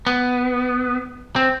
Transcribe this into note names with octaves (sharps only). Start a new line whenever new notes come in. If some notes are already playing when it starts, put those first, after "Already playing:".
B3
C4